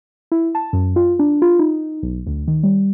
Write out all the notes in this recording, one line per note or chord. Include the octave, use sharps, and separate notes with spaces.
E4
A5
F#2
F4
D4
F4
D#4
B1
D2
D#3
G3